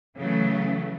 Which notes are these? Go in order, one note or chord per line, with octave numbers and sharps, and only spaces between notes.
C#3 E3 F#3 A3